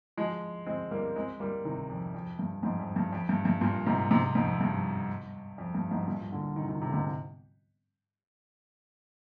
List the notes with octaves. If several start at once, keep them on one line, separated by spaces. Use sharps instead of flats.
F3 G#3
G#3 C4
G3 A#3
G#3 C4
G3 A#3
C3 D#3
F2
F2
G2
F2 G#2
F2
G2
F2
G2
G2
G2 A#2
G#2 C3
G#2 C3
F2 G#2
G2
F2
G2
F2 G#2
G2 A#2
A#2 D3
C3 D#3
C3 D#3
C3 D#3
D3
G#2 C3